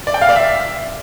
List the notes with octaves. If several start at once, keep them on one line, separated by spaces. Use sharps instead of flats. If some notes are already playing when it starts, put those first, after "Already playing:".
D5
G5
F5
D5
E5